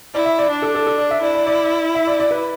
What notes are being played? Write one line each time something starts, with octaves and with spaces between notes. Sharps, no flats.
E4 D5
E5
D5
D4
A4
A4
A4
D5
E5
E4 D5
D5
D5
E5
D5
D5
B4